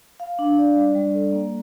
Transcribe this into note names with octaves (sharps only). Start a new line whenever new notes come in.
F5
D4
D5
G3
G3
A4
A#3